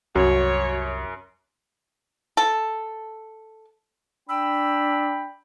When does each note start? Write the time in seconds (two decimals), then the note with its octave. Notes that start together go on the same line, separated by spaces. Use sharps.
0.15 C2 F#2 F#4 C#5
2.37 A4
4.29 D4 G5 B5 E6